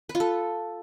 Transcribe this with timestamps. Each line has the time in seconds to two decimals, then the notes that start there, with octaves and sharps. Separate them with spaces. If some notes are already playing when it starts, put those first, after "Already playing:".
0.09 B4
0.15 F4
0.20 A4